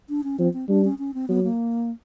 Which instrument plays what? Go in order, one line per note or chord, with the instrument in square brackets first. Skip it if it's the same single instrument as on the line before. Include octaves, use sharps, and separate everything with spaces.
[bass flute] D4
C#4
[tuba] F3 [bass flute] C4
[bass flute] C4
[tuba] G3 [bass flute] D4
[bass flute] C#4
C#4
C4
[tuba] F#3 [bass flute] B3
[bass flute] A#3